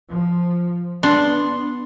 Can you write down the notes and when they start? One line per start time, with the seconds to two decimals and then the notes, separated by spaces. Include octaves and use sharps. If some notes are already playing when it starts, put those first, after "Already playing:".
0.10 F3
1.03 B3 D4 C6